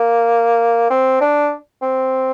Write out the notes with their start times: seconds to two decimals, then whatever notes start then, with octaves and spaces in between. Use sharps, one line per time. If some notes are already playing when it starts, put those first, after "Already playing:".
Already playing: A#3
0.90 C4
1.21 D4
1.82 C4